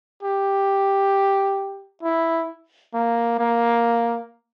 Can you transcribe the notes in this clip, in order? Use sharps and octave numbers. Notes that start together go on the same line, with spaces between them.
G4
E4
A#3
A#3